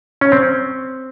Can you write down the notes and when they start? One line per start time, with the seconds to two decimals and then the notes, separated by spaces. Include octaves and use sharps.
0.21 C#4
0.32 C4